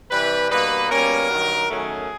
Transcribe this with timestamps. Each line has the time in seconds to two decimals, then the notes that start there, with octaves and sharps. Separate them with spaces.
0.11 C3 E3 G3 B4
0.50 B2 G3 A#3 D#4 B4
0.90 B2 G3 A#3 C#4 A#4
1.29 G2 D#3 F#3
1.69 F#2 D#3 F#3 A3 C#4 G#4